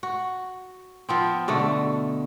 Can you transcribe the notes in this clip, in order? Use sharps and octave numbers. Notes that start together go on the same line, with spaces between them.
F#4
F3 B3 C4
B2 D3 A3